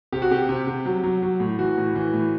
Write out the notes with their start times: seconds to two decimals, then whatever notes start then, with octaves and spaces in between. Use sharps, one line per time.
0.12 C3 G4
0.22 F#4
0.31 C3 G4
0.49 C3
0.67 C3
0.86 F#3
1.03 F#3
1.22 F#3
1.40 A2
1.59 E3 F#4
1.77 A2
1.95 E3
2.13 A2